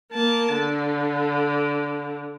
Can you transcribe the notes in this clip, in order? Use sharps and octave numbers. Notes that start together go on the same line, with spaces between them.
A#3 A5
D3